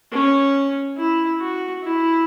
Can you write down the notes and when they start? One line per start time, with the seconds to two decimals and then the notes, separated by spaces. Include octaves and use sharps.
0.12 C#4
0.97 E4
1.40 F#4
1.83 E4